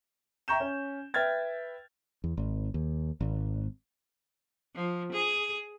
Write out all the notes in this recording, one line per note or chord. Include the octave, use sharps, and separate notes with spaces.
E5 G5 A#5 C#6 G6 E7
C#4
B4 E5 G5 F6 G#6 A6
E2
G#1
D#2
G#1
F3
G#4